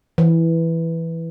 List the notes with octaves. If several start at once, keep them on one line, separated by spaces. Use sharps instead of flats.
E3